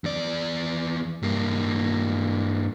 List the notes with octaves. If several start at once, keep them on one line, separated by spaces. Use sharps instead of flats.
E2 D5
G2 A#3